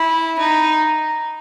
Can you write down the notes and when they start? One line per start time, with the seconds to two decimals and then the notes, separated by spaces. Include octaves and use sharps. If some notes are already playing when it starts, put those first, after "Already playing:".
Already playing: E4
0.38 D#4